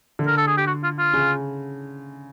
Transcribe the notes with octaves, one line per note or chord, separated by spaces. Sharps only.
D3
A#4
A4
G#4
G4
F#4
F4
F4
C#3